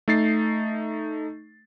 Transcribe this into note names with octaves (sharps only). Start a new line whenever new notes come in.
A3 D#4 A6 C7